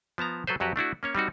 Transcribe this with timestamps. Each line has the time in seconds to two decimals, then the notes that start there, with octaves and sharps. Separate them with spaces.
0.18 F3 B3 A5 A#5
0.47 F#3 A4 B4 C5
0.60 F2 F#3 F#4 G4 B4
0.76 A3 D4 E4 F#4
1.03 A#3 C#4 C#5
1.15 G3 C4 D#4 F#4